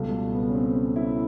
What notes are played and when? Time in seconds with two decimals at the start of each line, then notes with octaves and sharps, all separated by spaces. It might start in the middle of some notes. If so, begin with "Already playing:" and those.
Already playing: C#2 B2 G3 A3
0.34 B3
0.50 C#4
0.55 C4
0.76 C#4
0.96 E4